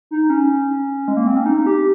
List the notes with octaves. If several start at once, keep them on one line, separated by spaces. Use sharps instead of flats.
D#4
C#4
G#3
A#3
C4
C#4
D#4
G4